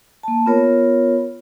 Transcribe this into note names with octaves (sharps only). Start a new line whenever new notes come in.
A#3 A5
B3 F4 A#4 C#5